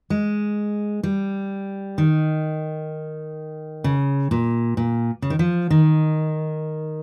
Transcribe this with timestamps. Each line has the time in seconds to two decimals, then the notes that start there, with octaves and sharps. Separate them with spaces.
0.10 G#3
1.03 G3
1.98 D#3
3.84 C#3
4.31 A#2
4.77 A#2
5.22 C#3
5.30 D#3
5.39 F3
5.70 D#3